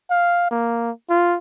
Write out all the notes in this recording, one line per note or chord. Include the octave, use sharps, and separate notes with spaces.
F5
A#3
F4